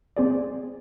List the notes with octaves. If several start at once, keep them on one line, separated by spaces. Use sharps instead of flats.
C4 G#4 D5